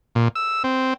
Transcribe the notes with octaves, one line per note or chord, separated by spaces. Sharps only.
A#2
E6
C4